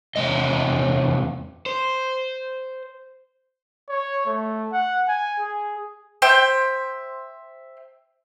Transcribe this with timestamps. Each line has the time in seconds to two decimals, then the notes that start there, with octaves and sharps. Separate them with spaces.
0.16 E2 C3 G#3 D#5
1.66 C5
3.89 C#5
4.26 A3
4.73 F#5
5.08 G#5
5.40 G#4
6.22 C5 E5 G5 C6